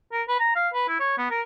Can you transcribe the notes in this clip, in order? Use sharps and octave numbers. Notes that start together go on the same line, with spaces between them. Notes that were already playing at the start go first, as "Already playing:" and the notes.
A#4
B4
A#5
F5
B4
E4
C#5
B3
A#4